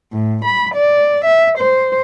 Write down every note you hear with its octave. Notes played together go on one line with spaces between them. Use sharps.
A2
B5
D5
E5
C5